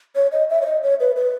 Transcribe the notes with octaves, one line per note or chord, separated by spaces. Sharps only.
C#5
D#5
E5
C#5
D#5
C#5
B4
B4